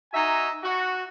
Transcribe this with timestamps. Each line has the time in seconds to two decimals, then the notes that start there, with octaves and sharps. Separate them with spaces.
0.13 D#4 F#4 E5 G#5 A#5
0.63 F#4